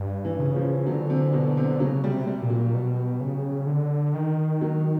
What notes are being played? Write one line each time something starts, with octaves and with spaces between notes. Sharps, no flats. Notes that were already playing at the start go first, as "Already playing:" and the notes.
Already playing: G2
E3
C#3
F3
D3 F#3
C3
B2
C3
C#3 F#3
G3
C3
G3
A#2
F#3
B2
C#3
D3
D#3
F#3